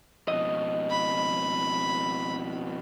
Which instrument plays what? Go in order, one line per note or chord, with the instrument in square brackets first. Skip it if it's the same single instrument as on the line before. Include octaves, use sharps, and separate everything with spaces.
[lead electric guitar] F2 B2 [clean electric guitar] D#5
[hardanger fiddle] B5